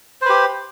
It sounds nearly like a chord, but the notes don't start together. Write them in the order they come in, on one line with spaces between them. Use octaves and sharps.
C5 B4 G4